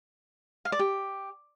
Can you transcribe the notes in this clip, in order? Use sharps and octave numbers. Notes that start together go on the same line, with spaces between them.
F5
D5
G4